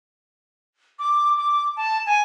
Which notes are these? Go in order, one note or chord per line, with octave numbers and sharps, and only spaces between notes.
D6
D6
A5
G#5